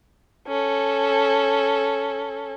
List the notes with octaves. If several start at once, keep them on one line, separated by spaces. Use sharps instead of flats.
C#4 A4